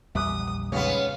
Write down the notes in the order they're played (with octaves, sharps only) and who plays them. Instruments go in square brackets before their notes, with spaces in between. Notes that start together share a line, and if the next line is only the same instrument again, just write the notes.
[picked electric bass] A#1 E2 G3 [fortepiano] E5 D6 F#6 [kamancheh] D#6
[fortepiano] G#1 C#2 C#5 [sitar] B3 C#4 [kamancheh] F5